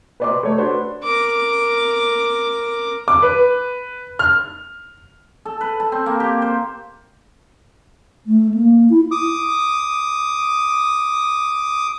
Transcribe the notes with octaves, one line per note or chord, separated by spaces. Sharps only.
B4 C5 D5 D#5 C6 D6
A3 C#5
D4 F#4 B4 C5
A#4 D6
D6
B4
F6
A4
B4
A5
C4
A#3
G4
C5
A3
A#3
E4
D6 D#6